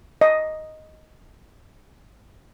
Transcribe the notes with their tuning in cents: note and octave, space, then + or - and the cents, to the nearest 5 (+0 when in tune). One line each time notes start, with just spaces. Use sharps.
D#5 +5